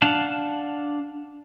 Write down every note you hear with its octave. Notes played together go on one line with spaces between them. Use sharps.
D4 F5 F#5 A5